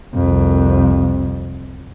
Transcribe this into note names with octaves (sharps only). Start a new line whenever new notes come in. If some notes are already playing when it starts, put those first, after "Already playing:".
C2 F2